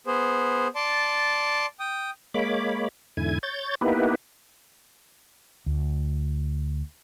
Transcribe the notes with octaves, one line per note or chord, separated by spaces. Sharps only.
B3 G#4 C5
D5 A5 C6
G5 D#6
G#3 A#3 C#5 B5 D6
E2 G#2 D3 E4 G#5 G#6
C#5 G6 A6
A#3 B3 D#4 E4 G4 B4
D2